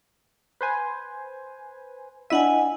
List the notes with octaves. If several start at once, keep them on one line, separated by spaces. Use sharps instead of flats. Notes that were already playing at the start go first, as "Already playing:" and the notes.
B4 C5 G#5
D4 E4 D#5 E5 F#5 G#5